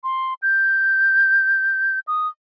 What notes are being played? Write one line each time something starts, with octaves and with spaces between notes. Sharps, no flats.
C6
G6
D#6